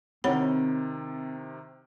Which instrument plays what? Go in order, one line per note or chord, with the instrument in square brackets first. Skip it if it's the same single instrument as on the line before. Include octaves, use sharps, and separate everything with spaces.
[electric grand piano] C3 D#3 [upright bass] C4 E4 [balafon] C#5 F#5 B5